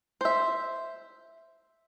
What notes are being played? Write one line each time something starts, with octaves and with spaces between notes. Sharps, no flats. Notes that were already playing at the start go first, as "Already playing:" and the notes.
C5 E5